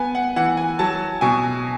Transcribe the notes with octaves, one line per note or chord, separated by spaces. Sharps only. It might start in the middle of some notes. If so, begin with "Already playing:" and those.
Already playing: B3 G#5
F#5
E3 F#5
G#5
F#3 A5
B2 G#5